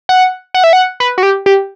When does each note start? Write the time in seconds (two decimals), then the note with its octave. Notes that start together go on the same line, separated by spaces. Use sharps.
0.09 F#5
0.54 F#5
0.64 E5
0.73 F#5
1.00 B4
1.18 F#4
1.23 G4
1.46 G4